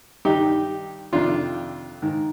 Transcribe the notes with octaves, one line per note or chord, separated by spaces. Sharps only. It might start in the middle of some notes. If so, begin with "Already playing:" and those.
G2 D#3 D#4 G4
F2 C3 D#3 D4 F4
G#2 D#3